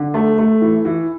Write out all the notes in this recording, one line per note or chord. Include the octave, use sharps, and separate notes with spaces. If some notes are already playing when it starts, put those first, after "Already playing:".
Already playing: D3
A3
A3
E3
E3